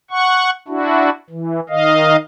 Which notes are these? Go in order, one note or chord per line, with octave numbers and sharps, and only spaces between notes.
F#5 C#6
D4 E4 F#4
E3
D#3 D#5 F5